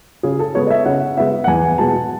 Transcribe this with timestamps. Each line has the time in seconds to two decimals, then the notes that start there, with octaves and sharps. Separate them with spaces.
0.23 C#3 G#4
0.39 A4
0.55 G#3 B3 C#5
0.66 D#5
0.70 E5
0.85 C#3 F#5
1.17 G#3 B3 E5
1.44 F#5
1.47 E2 G#5
1.78 B2 G#3 A5